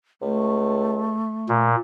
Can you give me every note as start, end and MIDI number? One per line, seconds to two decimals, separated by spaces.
0.22 1.18 37
0.22 1.66 57
1.49 1.76 46